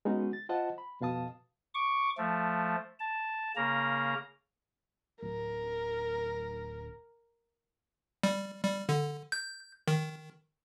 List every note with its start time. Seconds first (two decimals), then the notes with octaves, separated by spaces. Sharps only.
0.05 G#3 B3 C#4 D#4 F#4
0.33 A6
0.49 F4 C5 D#5 F#5 A5
0.78 B5
1.01 F2 B2 F5 A5 D#6
1.74 C#6 D6
2.18 F3 A3
3.00 A5
3.56 C#3 A#3 A#5
5.23 D1 A#4
8.23 G3
8.63 G3
8.89 D3
9.32 G6
9.88 D#3